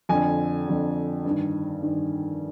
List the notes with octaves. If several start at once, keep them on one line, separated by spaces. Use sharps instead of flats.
F2 D3 G#5
F2 D3
G2 D#3
G2 D#3